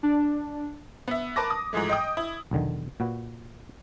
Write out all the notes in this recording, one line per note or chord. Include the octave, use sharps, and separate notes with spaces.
D4
B3 E5
A#4 B4 A5 D6 A#6
D#6
G#2 E3 F3 G#3 A3
D#5 G5 D#6
E4
B1 E2 D3 D#3
A#2 F#4 B4